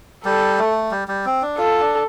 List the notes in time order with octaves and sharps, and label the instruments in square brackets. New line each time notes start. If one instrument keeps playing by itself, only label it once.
[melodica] G3 [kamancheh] A4
[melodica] A3
G3
G3
C4
D4
[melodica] F4 [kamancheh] A4
[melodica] D4